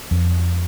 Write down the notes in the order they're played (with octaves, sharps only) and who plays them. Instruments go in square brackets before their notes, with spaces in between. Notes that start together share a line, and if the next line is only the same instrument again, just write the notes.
[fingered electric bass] F2